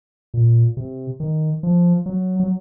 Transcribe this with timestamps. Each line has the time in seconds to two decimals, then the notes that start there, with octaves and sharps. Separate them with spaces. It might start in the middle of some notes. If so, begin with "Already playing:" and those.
0.34 A#2
0.77 C3
1.20 D#3
1.63 F3
2.06 F#3
2.40 F#3